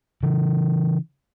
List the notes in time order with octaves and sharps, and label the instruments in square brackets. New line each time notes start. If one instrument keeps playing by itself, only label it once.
[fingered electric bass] C#3 E3